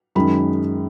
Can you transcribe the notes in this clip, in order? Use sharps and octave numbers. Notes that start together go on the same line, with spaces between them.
F#2 D#3 G#3 C#4 B5